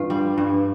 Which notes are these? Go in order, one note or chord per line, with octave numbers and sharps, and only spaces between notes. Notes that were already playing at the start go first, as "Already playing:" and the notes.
Already playing: G2 E3 F4
G3
G2